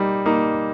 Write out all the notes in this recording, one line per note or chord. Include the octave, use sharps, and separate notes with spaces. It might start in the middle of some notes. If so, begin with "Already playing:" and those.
Already playing: G3 A#3 D#4
A#3 D#4